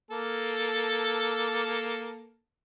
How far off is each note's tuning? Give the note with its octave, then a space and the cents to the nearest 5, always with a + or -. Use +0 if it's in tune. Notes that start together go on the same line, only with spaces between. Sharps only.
A#3 +0 A4 +0